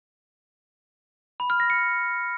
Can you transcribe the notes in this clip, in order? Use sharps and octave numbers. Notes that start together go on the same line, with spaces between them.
B5
F6
A#6
C#7